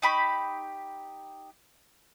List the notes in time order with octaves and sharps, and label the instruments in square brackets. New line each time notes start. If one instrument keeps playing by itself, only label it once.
[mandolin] D#4 G4 B5 C#6